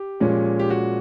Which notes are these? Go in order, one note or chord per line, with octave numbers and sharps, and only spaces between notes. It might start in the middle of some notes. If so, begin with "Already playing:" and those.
Already playing: G4
A#2 F3 G#3 C#4
G4
F#4